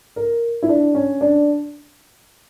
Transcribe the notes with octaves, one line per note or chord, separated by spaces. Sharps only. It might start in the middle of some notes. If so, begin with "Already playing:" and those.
A#4
E4
D4
C#4
D4